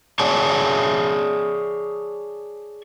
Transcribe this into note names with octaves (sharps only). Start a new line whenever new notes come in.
G#4 C#5 D5 G#5 A5